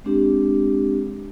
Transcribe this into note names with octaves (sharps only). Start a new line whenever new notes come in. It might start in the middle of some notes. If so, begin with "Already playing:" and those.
G#3 C4 D4 G4